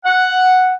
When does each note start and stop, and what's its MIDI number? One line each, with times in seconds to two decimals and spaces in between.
0.05 0.73 78